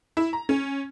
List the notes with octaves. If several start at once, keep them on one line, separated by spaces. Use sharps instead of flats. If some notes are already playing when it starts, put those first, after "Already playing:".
E4
A#5
C#4